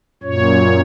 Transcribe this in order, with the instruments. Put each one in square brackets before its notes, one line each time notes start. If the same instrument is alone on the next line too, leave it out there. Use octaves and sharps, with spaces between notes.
[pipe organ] F#2 A#2 C#5